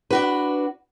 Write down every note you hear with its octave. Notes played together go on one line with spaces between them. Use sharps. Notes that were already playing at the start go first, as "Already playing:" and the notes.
D4 F#4 B4